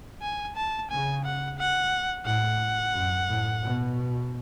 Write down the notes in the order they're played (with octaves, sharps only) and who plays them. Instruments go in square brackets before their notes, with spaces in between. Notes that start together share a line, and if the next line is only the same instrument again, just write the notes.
[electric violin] G#5
A5
[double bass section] C#3 [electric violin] G#5
[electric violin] F#5
F#5
[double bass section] A2 [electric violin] F#5
[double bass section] F#2
A2
B2